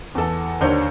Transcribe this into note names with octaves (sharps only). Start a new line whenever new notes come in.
E2 A4
D#2 D3 D4 C5 C#5 G6